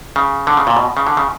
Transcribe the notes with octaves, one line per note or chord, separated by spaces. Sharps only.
C#3
D3
C#3
A#2
B2
C#3
D3
C#3